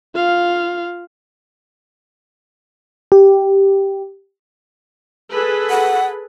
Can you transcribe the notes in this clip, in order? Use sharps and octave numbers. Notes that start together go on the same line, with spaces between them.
F4 F5
G4
G#4 A4 B4
F#5